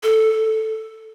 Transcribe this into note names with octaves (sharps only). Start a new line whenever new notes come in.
A4